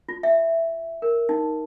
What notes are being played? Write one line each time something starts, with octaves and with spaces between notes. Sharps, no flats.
F4
E5
A#4
D#4